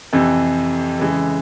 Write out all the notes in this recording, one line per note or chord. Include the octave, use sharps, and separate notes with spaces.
F2 C3 E3
C#3 E3 G#3